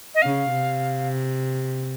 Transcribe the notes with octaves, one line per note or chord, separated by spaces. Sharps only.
D#5
C#3 F5
C3